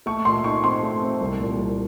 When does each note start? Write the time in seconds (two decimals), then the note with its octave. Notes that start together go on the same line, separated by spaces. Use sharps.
0.06 A3 C#6
0.25 A#2 C6
0.44 D#4 C#6
0.63 C4 C6
0.83 A3
1.02 C4
1.21 C2
1.40 A#2
1.57 C2